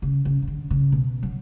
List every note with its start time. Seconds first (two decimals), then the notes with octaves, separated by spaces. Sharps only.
0.02 C#3
0.25 C#3
0.42 C#3
0.48 D3
0.70 C#3
0.92 B2
1.23 F#3